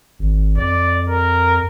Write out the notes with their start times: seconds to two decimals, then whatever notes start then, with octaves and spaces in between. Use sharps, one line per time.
0.19 G#1
0.57 F2 D5
1.09 A#4